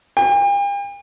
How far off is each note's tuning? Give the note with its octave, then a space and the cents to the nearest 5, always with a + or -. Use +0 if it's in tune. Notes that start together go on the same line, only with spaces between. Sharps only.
G5 +45